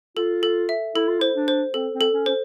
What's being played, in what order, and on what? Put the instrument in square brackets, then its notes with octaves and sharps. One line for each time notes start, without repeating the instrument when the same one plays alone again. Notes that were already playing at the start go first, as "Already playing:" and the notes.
[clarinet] F4 [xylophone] A4
[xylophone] A4
E5
[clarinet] E4 [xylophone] A4
[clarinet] F4
[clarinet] E4 [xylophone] C5
[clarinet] D4
[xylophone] C5
[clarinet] C4 [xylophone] A4
[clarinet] C4
[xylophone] A4
[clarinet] C#4
[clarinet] C#4 [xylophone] C5